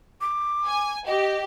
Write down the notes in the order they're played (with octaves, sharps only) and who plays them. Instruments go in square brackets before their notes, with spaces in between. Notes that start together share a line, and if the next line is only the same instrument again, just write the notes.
[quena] D6
[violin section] G#5
[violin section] G4 [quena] D#5